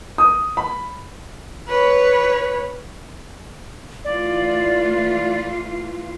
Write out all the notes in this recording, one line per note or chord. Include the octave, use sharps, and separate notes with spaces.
D#6
B5
B4 C#5
E3 A3 F4 D5